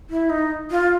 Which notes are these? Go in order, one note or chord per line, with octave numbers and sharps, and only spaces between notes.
E4
D#4
F4